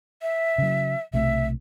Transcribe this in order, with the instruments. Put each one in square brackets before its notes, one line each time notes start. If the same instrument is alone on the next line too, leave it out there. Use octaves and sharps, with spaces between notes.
[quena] E5
[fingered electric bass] C#3 F#3
[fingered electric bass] B1 C3 A3 [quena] E5